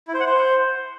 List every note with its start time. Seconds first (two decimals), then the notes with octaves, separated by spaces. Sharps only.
0.08 E4
0.14 C5
0.20 F#5
0.26 C5